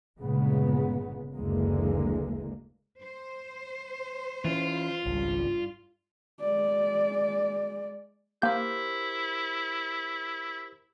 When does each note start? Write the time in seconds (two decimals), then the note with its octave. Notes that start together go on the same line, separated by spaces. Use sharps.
0.20 G1 A#2 C#3 G#3 B3
1.35 F#1 D2 D3 E3 G#3 A#3
3.02 C5
4.45 E3 C#4 F4
5.06 G#1 C#2 G2 G3
6.41 G#3 D5
8.42 A#3 E4 G4 A#4 C5 G6